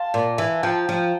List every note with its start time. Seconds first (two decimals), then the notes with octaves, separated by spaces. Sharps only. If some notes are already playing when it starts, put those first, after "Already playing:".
Already playing: F5 G5 A5 C6
0.14 A#2
0.38 E3
0.63 F3 G5 A#5
0.89 F3